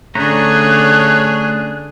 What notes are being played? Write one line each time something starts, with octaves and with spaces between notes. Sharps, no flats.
D3 A3 C#4 D4 G#4 C#5 A#5 F#6